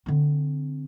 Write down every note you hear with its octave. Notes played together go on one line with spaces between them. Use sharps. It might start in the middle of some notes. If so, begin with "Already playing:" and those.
D3 C4